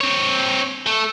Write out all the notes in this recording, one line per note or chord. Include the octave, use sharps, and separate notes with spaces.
C4 C#5
A3